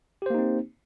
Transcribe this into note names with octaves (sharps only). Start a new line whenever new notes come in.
A#3 C4 D#4 G4 C5